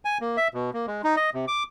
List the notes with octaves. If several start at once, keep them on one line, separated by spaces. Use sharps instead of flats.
G#5
A#3
E5
B2
A#3
G#3
D#4
D#5
C3
D6